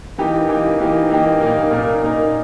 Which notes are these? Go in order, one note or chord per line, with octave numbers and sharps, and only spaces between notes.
E3 A#3 D#4 G4
E3 A#3 D#4 G4
E3 A#3 D#4 G4
E3 A#3 D#4 G4
A#2 A#3 D#4 A#4
A#2 A#3 D#4 A#4
A#2 A#3 D#4 A#4